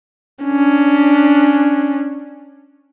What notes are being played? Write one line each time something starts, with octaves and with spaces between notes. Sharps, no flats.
C#4 D4